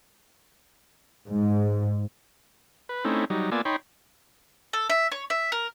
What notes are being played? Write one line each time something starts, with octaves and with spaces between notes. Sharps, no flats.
G#2
B4
A3 C4 C#4 D#4 E4
F#3 G3 D#4
A#3 B3 F4 D5 G#5 E6
D#4 C#5 G5 B5 C6
A4
E5
C#5
E5
A#4